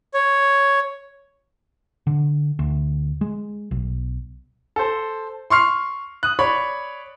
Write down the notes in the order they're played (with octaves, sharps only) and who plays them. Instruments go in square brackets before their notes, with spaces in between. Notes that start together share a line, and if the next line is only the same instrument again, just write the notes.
[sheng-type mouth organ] C#5
[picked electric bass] D3
D2
G#3
B1
[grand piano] A4 C5
C6 C#6 F6 C7
D#6 F#6
C#5 D5 B5 C#6